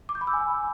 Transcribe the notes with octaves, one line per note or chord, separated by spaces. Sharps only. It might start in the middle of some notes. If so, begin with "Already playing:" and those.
D6
G6
B5
E6
G#5